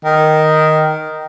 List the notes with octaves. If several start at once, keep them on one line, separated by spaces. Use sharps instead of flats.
D#3